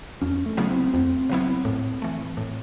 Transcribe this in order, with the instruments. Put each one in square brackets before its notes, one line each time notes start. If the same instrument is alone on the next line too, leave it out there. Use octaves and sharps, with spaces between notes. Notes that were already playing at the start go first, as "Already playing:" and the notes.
[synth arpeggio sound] F2 [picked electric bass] C#4
[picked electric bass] A3
[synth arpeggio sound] C#3 F#3 B3 E4
[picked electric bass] C4
[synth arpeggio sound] F2 [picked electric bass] C4
[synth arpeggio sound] C#3 F#3 B3 E4
A2
E3 A3
A2